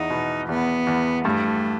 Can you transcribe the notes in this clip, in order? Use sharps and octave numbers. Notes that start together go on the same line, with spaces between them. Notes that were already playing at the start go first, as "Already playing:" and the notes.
Already playing: E2 D#4
B2
E2 B3
E2
G2 A3